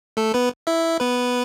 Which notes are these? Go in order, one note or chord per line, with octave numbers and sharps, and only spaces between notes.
A3 A4
B3 B4
E4 E5
B3 B4